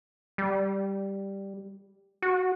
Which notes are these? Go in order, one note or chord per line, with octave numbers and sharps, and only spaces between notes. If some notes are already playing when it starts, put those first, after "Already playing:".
G3
F#4